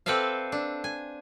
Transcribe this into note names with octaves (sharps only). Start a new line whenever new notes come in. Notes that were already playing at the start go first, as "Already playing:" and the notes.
C4 A4 B4 D5 E5 F5
D4
G#5